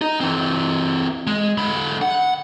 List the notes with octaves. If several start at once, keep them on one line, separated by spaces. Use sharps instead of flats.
D#4
E3 C4
G#3
D3 B5
F#5